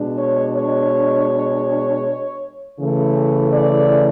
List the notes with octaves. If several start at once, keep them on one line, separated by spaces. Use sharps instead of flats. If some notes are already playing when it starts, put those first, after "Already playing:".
Already playing: B2 G#3 D4
C#5
C#5
C#3 E3 A3
D5